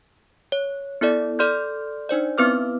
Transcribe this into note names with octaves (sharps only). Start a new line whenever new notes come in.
C#5
B3 E4 A4 D5
A4 D5 C6 F6 G6
D4 D#4 C5 D5
B3 C4 E4 B4 D6 F6